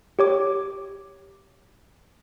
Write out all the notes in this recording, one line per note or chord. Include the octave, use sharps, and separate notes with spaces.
G4 C#5 D6